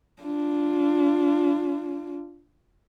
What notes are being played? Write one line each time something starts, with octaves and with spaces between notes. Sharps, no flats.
D4 F4